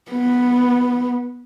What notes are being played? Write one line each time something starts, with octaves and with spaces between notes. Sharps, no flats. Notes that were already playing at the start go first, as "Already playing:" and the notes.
B3